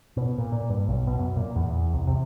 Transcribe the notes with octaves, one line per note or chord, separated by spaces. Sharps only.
B2
A#2
A#2
G2
B1
B2
F#2
A#2
E2
E2
C2
C3